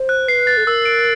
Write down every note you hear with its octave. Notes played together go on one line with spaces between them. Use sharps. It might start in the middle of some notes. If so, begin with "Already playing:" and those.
Already playing: C5
F#6
B4 C7
A6
A4
A#4 E6
D7